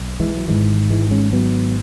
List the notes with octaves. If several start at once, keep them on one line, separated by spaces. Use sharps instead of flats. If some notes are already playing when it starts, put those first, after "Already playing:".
Already playing: B1
E3 G#3
F#3
G#1 G#2 E3 G#3
E3 G#3
G#3 C#4
F#3 B3